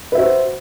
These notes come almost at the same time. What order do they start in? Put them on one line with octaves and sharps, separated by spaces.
B4 E5 F#4 C5